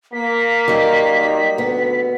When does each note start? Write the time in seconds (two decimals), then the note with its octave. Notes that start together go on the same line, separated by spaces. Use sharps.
0.13 A#3 B6
0.68 D#3 F#3 G3
1.58 D2 B3